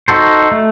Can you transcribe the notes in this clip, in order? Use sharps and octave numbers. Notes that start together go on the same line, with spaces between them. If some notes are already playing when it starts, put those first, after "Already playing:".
D#4 F#4 A4 C5
A3